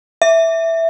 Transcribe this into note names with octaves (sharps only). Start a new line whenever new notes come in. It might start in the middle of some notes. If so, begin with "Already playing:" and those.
E5